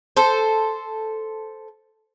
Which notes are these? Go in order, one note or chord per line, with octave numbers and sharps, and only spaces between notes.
A4 C5